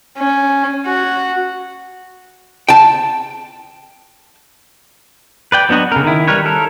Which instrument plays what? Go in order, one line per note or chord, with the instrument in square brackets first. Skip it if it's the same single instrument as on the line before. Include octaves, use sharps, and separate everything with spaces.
[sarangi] C#4
F#4
[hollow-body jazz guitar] G5 A5
[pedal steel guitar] B4 D5 G5
F#3 B3 D4 F#4 D#5
C#3 A#4
D#3 E4
G3 A#4 B4 C#5
A4 A#4